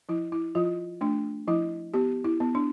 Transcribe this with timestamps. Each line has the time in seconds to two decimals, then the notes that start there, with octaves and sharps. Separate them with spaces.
0.09 F3 E4
0.32 E4
0.55 F3 F4
1.01 A3 D4
1.48 F3 E4
1.94 B3 G4
2.24 E4
2.40 B3
2.55 D4